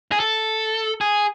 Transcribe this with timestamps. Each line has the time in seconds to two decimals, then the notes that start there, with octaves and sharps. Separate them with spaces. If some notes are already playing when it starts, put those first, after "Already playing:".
0.12 G#4
0.20 A4
1.01 G#4